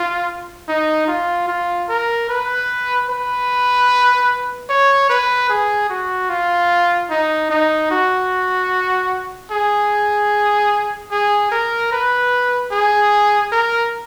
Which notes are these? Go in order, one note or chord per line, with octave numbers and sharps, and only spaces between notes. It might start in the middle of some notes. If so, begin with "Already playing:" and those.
Already playing: F4
D#4
F4
F4
A#4
B4
B4
C#5
B4
G#4
F#4
F4
D#4
D#4
F#4
G#4
G#4
A#4
B4
G#4
A#4